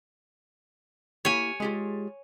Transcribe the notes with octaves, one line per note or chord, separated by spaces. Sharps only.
A#3 E4 G4 C#5 G#5
G#3 F4 G4 G#4